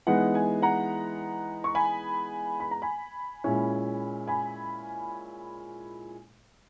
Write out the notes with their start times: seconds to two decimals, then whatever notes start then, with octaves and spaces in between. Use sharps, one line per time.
0.07 E3 G#3 B3 D#4 F#5
0.35 G#5
0.62 F#5 A#5
1.64 C#6
1.75 G#5 B5
2.60 B5
2.71 A#5
2.82 G#5 B5
3.44 A#2 G#3 C#4 E4
4.28 G#5 B5